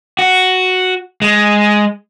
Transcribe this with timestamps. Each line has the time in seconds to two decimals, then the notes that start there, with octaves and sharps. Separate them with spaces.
0.19 F#4
1.22 G#3